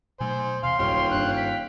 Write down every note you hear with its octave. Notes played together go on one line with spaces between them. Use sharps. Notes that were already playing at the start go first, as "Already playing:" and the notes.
B2 F#3 A3 C5 G#5
E2 C3 F5 C6
D#1 A1 F#2 A#2 C#5 F5 G5
G1 G2 D4 F#6
B6